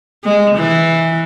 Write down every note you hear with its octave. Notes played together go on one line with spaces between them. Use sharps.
G#3
E3